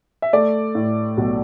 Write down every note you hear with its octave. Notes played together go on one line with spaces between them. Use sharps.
E5
A3 D5
A2
B1